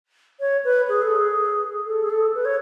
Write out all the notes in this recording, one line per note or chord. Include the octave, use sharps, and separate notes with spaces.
C#5
B4
G#4
A4
G#4
A4
G#4
A4
B4
C#5